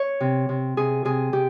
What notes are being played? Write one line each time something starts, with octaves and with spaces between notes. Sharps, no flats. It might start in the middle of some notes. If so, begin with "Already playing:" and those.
Already playing: C#5
C3
C3
C3 G#4
C3 G#4
C3 G4